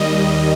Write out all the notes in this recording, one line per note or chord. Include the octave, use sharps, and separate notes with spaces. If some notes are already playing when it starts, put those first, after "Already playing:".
Already playing: D#2 D#3 G3 D#5